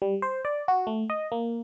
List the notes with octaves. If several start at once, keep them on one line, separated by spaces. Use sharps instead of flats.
G3
C5
D5
F#4
A3
D#5
A#3